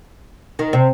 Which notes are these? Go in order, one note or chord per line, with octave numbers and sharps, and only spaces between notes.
D#3
C3